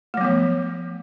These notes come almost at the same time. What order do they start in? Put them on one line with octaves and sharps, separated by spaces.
A3 F#3 B3 F3